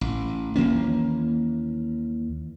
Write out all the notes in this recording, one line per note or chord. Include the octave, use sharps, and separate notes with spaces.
A1
D#2 E3 A#3 C#4